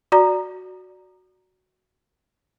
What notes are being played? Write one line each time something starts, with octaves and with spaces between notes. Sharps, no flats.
F#4 D5 A#5